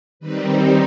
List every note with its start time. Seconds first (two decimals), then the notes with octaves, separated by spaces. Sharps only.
0.20 D#3 G3 C4 D#4 B4